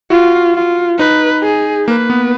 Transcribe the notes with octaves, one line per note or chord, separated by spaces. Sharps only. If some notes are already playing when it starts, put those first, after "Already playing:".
F4 F#4
F4
D#4 B4
G#4
A#3 B4
B3